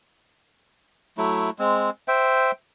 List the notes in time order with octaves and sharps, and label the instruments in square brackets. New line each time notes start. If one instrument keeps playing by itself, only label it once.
[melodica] F#3 A3 E4
G#3 C4
C5 E5 G5